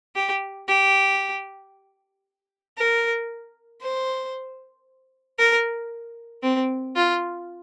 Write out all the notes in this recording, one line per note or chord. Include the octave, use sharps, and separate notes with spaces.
G4
G4
A#4
C5
A#4
C4
F4